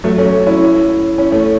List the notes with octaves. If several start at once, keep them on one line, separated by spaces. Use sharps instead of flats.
F#3 A3
A3 C#4
C#4 E4
C#4 E4
A3 C#4